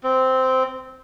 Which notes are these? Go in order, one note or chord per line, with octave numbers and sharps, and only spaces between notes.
C4